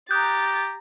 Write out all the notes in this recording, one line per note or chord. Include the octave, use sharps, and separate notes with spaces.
G4 A#5 D#6 F#6 G6 A6